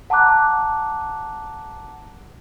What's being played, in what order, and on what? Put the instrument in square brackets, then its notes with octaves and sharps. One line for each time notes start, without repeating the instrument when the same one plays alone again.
[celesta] F#5 A5 A#5 D6 F#6